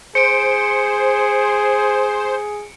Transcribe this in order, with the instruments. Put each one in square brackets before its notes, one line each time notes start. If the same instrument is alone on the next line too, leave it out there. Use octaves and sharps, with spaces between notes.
[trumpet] G#4 [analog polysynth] C5 [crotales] C#7 D7